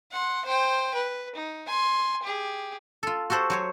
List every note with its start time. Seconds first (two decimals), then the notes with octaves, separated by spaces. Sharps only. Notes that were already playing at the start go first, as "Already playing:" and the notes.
0.11 F#5 C6
0.45 C5 G5
0.94 B4
1.35 D#4
1.67 G#5 C6
2.23 G4 G#4
3.03 F4 A4
3.30 F#4 G4 A4 C5 F#5
3.50 F#3 C5 C#5